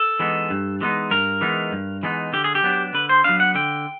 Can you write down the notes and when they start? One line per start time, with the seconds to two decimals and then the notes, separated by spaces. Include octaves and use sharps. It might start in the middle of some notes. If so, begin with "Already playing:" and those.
Already playing: A4
0.19 E3 G#3 B3 D#4
0.50 G2
0.81 E3 G#3 B3 D#4
1.11 G2 A#4
1.41 E3 G#3 B3 D#4
1.72 G2
2.03 E3 G#3 B3 D#4
2.33 D3 G4
2.44 G#4
2.55 G4
2.63 F#3 B3 D4
2.94 D3 B4
3.09 C5
3.24 F#3 B3 D4 F5
3.40 F#5
3.55 D3 G5